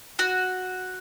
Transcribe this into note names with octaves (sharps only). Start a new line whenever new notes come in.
F#4